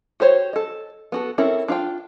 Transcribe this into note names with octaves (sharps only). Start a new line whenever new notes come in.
F#4 G4 C5 C#5
A4 D#5
B3 F#4 A4
C4 C#4 E4 A4 A#4
D4 F4 F5 G5